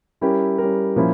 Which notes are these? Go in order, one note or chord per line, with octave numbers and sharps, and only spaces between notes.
G3 C#4 E4 G4 A#4
G3 C#4 E4 G4 A#4
A#2 F3 A#3 C#4 E4